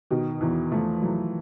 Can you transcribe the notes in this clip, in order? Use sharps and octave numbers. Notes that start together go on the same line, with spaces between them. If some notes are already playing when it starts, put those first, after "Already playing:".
B2 D#3
E2 E3
F3 A3
E3 F#3